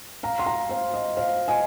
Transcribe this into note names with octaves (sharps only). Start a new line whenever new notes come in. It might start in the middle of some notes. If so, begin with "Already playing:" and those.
F5 A#5
C6
F5 A#5
C5 F5
D#5
C5 F5
D#5 G#5